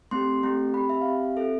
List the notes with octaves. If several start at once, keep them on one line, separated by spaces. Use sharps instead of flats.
A3 C4 G4 C6
A3 C4 G4
C4 G4 B5
E5
F5
C4 G4 E5
C4 F4 A4 E5